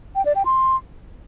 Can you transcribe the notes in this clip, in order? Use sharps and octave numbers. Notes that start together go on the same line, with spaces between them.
G5
D5
G5
C6